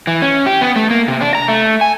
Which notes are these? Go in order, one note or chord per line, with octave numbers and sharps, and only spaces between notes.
E3
C#4
G4
B3
A3
A#3
C3
D4
A#5
A3
G#5